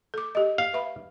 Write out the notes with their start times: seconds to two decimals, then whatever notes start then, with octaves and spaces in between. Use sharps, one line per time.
0.14 A4 D6
0.35 G4 D#5
0.58 F5
0.73 B4 E5 B5